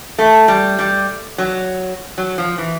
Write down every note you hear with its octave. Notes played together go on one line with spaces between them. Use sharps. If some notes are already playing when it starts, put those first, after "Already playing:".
A3
G3
G3
F#3
F#3
F3
E3